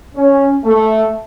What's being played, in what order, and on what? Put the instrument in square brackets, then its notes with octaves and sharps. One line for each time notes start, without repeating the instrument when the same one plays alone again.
[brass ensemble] C#4
A3